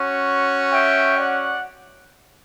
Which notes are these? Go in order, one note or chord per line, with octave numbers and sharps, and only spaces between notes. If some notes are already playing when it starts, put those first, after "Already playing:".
Already playing: C#4 F#4
E5 G5
D5 F#5